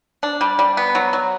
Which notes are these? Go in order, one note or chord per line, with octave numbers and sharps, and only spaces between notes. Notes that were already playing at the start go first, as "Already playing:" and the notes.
D4
G3
G3
B3
F#3
F#3